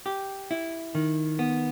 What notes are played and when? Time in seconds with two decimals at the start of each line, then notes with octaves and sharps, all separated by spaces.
0.06 G4
0.51 E4
0.95 D#3
1.39 B3